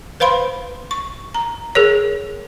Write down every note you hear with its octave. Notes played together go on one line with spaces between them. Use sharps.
B4 C5 F5 B5 C6
C#6
A#5
G#4 A#4 C#5